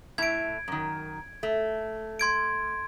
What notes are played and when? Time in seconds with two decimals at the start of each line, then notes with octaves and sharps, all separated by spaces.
0.18 A2 E4 G#6 D7
0.68 F#2 D#3
1.43 A3
2.19 C6 G#6 D7